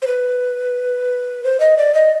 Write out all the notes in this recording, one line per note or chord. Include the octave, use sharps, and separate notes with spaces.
C5
B4
C5
D#5
D5
D#5